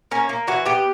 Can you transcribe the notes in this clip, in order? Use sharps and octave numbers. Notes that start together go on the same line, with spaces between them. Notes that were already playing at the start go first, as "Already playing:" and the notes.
A#3 C#4
A#3
E3 F#4
B3 G4